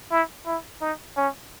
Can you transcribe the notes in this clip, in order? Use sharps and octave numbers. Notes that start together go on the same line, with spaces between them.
E4
E4
D#4
C#4